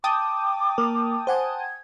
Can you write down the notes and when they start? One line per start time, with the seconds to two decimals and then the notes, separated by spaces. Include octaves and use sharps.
0.04 G5 A5 D6 D#6
0.78 A#3 A#4
1.27 C5 F#5 G#5
1.60 G#6